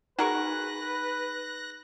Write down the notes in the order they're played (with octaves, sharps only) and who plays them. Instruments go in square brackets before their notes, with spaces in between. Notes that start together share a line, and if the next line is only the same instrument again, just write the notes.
[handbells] D#4 G#4 [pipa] F#4 A#4 C#6 [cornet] B4 [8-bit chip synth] F#6 A#6